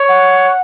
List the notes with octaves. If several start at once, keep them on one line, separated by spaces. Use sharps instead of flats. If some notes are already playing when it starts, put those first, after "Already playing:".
Already playing: C#5
F#5